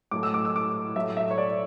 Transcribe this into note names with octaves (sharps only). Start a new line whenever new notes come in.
A2 F#3 A3 D6
E6
D6
E6
D6
A2 F#3 A3 E5
E5
C#5
D5